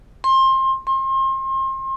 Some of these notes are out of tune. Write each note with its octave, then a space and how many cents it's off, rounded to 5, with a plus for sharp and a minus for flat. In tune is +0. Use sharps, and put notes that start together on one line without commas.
C6 +25
C6 +35